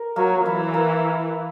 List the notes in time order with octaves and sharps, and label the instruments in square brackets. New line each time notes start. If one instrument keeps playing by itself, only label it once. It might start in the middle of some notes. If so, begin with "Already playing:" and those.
Already playing: [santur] A#4
[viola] F#3 [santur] A#3
[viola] E3 [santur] E4
[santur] A#3